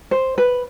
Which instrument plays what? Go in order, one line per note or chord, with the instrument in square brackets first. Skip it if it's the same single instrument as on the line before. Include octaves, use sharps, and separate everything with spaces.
[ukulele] C5
B4